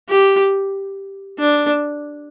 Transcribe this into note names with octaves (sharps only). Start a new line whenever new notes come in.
G4
D4